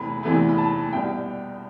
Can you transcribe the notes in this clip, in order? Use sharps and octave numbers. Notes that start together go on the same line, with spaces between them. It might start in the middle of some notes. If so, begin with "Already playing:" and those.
Already playing: E2 C3 E3 A3 B5
E2 C3 E3 A3
B5
A5
C2 B2 G3 G5